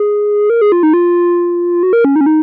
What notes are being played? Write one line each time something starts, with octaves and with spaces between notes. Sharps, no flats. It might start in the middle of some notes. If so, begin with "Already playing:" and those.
Already playing: G#4
A#4
G#4
F4
D#4
F4
F#4
A#4
C#4
D#4
C#4
D#4